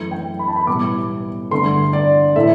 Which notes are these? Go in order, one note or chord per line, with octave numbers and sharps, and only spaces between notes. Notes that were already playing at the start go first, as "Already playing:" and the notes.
Already playing: F#2 E3 A3
G5
B5
A5
B5
B1 A2 G3 B3 E4 D6
G2 D3 A3 C6
D5
A2 E3 A3 E4 E5